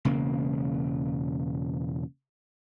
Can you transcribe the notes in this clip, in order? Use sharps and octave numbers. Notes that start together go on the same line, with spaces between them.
E1 C#3 A#3